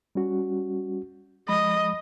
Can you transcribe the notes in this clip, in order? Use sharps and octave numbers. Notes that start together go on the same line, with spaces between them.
G3 C#4 F#4
F3 G#3 D#5 B5